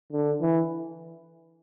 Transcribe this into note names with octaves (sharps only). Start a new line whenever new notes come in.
D3
E3